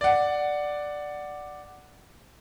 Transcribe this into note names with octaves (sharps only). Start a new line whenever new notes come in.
D5 F#5